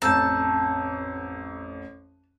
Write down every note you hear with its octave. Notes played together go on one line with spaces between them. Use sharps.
A1 F2 A5 A#5 E6 G6